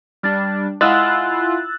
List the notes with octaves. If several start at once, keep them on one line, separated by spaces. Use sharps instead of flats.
G3 D4 F6 A6
G#3 E4 F4 F#5 G#5 E6 F#6 A6